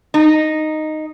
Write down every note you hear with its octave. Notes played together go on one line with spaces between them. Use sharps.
D#4